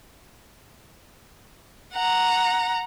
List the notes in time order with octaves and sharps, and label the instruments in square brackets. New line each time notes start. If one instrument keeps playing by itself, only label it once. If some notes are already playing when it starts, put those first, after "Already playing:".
[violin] F#5 A#5